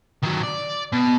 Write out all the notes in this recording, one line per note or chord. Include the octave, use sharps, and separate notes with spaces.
D#3 F#3
D5
B2